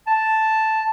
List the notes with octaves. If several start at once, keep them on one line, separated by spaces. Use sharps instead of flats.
A5